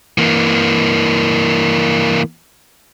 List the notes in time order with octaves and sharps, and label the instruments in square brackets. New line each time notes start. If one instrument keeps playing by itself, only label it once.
[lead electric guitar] E3 A#3